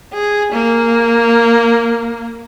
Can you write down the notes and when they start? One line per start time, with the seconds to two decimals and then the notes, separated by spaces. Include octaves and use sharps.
0.14 G#4
0.53 A#3